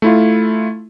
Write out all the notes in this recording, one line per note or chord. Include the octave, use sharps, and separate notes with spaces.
A3 E4 F4